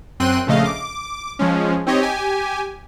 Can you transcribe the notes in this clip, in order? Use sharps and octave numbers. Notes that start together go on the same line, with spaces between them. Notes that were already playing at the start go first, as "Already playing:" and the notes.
F#2 C4 G5 C6 F#6 D#7
A#1 C#3 A3 D#5 F5
D6
F3 G#3 C#4
C4 D#4 G4 C#5 D#5
G4 G#5